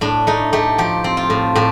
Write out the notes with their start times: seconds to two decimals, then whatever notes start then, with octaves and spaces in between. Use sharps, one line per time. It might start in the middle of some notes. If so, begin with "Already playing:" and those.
0.01 A2 D4
0.27 A3 D#4
0.53 A3 G4
0.78 F3 G4
1.04 C4
1.17 F4
1.30 A2
1.55 A2 G4